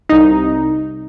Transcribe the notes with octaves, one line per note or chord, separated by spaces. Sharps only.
C2 D#4